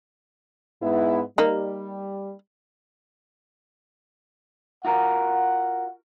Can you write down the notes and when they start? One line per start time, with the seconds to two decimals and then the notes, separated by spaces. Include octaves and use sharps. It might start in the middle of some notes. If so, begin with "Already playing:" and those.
0.82 G#2 B3 E4
1.38 G3 A#3 D#4
4.85 F4 F#4 A#4 F#5